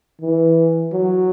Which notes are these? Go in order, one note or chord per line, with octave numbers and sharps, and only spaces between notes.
E3
F#3